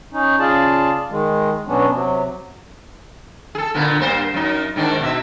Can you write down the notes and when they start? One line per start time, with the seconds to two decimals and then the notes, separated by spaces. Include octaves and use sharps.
0.13 C#4 D#4
0.39 C#3 F4 G#4 D5 A5
1.10 D#3 G#3
1.68 B2 F#3 B3 C#4 D4
1.92 C3 F#3
3.55 G#4 A4
3.74 A#2 D3 B3
3.99 G2 A#3 C5
4.34 F#2 D#4
4.76 G#2 D#3 D4
5.00 B2 E5